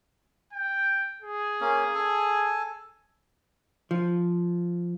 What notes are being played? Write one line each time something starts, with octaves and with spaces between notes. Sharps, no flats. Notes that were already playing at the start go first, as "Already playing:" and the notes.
G5
G#4
A#3 C#4
A4 G#5
F3